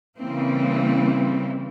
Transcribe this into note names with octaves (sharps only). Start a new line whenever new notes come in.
C#3 E3 G3 A#3 C4